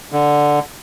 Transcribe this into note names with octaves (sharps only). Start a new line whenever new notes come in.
D3